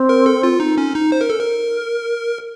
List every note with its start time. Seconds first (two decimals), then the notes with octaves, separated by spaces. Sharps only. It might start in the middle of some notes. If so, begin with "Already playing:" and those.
Already playing: C4
0.09 A#4
0.26 A4
0.43 F4
0.60 D#4
0.78 C#4
0.95 D#4
1.12 C5
1.21 A#4
1.30 A4
1.39 A#4